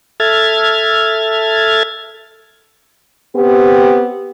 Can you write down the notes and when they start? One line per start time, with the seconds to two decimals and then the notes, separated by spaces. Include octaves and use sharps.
0.20 A4 E5 F6 G#6 A6
3.36 B3 C4 G4